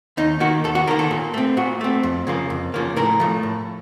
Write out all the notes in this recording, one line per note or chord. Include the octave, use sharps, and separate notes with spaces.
D#2 D#4
D#3 A#3 F#4
D#2 A4
F#4
D#3 A#3 A#4
A4
A#2
A3 C4
A#2 F#4
A3 C4
F2
C#3 F3 A#3
F2
C#3 F3 A#3
A2 A#4
F3 A3
A2